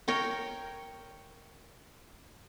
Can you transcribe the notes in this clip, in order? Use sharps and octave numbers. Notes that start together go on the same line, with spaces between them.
A#4 C#5 G5